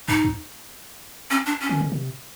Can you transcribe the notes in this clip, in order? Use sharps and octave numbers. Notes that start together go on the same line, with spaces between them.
F2 D#4
E2
C#4
D4
C#4
D3
C#3
C3